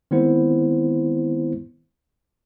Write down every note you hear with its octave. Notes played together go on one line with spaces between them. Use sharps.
D#3 G#3 B3 C4 E4 C5